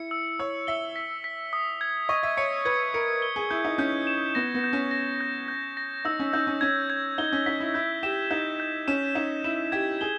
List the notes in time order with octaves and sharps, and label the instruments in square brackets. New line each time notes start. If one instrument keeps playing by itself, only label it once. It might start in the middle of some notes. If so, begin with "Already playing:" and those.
Already playing: [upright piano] E4 [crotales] C#7
[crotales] E6
[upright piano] C#5 [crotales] E6
[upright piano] E5 [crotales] G7
[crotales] B6
B6
D#6
G#6
[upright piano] D#5 [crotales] C#6
[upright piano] E5
[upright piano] C#5 [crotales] C#7
[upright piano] B4 [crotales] G#6
[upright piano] A#4 [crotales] C#7
[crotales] G7
[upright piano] G#4
[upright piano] E4 [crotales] G6
[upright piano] D#4
[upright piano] C#4 [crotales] G6
[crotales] E7
[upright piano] B3 [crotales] A#6
[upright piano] B3
[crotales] G6
[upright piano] C#4
[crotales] A#6
G6
G6
A#6
[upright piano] D#4 [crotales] E6
[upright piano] C#4
[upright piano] D#4 [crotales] G6
[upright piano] C#4
[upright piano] C#4 [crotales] G#6
[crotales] G#6
[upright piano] D#4 [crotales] G7
[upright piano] C#4
[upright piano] D#4 [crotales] B6
[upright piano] E4
[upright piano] E4 [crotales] G6
[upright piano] G4 [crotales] E7
[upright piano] D#4 [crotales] G6
[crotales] G6
[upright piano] C#4 [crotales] E7
[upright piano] D#4 [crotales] E7
[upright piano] E4 [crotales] E7
[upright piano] G4 [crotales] G#6
[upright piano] G#4 [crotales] G7